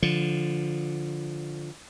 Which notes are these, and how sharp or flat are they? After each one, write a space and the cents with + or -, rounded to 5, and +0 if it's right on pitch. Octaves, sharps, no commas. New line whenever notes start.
D3 -5 F3 +0